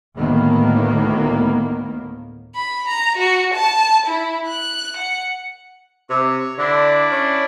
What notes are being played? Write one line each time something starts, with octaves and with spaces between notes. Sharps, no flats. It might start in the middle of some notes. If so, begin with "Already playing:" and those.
D2 A2 D#3 A#3 B3
B5
A#5
F#4
A5
E4
F#6
F#5
C3 C#5
D3 D4 E4
C#4